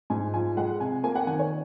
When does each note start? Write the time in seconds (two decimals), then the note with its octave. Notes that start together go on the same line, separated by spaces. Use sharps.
0.10 G#2 G#5
0.34 F3 G#5
0.57 G#3 F#5
0.80 C3 G#5
1.03 A#3 G#5
1.15 F#5
1.27 D#3 G#5
1.39 C#5